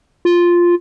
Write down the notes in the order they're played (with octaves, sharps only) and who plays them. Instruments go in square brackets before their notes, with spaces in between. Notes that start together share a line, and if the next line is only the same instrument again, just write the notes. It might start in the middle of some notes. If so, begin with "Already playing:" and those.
[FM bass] F4